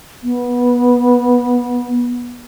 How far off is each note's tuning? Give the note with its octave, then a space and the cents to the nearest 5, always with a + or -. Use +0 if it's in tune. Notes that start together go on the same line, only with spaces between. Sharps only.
B3 -20